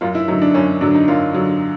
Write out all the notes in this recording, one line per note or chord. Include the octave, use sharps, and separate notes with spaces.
F#2 F4
E4
D3 F#3 D#4
D4
F#2 C#4
C#4
D3 F#3 D4
D#4
F#2 F4
D3 F#3